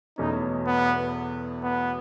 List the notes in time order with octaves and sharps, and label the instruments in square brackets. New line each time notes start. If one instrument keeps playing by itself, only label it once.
[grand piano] E2 B2 F#3 A3 C#4 [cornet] D#4
[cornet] B3
B3